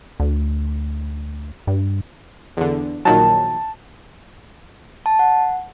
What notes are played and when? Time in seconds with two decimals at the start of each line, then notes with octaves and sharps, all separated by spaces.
0.20 D2
1.67 G2
2.57 E2 D3
3.05 A#1 D#3 F#3 A5
5.06 A5
5.19 F#5